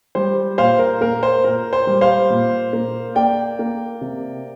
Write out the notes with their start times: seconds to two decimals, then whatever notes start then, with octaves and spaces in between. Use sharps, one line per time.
0.15 G3 C5
0.58 A#2 C5 F5
0.79 A#4
1.01 A#3 A#4
1.23 C5
1.44 A#2 A#4
1.73 C5
1.87 G3
2.01 C5 F5
2.30 A#2
2.73 A#3
3.15 A#3 D5 G5
3.59 A#3
4.01 C3